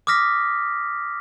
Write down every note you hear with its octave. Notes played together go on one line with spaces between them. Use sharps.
D6 D#6 F6 A#6 B6